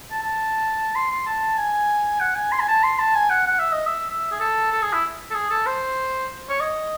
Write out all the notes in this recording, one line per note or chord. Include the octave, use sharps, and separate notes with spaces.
A5
A5
C6
C6
A5
G#5
F#5
G#5
C6
G#5
A5
C6
A5
G#5
F#5
F#5
E5
D#5
E5
E5
G#4
A4
A4
G#4
E4
A4
G#4
A4
C5
C#5
D#5